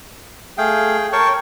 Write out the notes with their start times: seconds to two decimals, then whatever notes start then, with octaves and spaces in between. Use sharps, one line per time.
0.58 A3 G#4 F5 G5
1.13 A#4 C#5 G5 A5 C#6